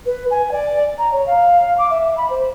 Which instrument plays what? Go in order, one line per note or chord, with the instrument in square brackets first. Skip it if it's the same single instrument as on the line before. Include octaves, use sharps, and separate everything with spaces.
[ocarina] B4
G#5
D5
A#5
C#5
F5
D6
E5
B5
C5